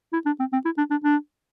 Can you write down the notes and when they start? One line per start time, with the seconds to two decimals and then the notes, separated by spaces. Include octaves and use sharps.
0.13 E4
0.26 D4
0.40 C4
0.53 C4
0.65 E4
0.78 D4
0.91 D4
1.04 D4